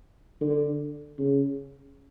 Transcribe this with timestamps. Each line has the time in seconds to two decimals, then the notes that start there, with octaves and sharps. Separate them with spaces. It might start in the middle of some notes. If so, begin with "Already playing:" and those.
0.41 D3
1.18 C#3